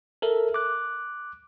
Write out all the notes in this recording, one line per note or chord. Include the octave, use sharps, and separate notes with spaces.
A4 A#4 E5
D6 F#6